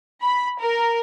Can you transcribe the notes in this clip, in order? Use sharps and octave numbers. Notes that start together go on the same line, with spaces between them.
B5
A#4